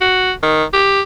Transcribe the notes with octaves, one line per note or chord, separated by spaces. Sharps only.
F#4
D#3
G4